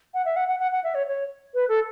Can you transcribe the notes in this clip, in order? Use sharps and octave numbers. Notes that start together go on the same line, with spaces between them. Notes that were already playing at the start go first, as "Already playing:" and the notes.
F#5
E5
F#5
F#5
F#5
F#5
E5
C#5
C#5
B4
A4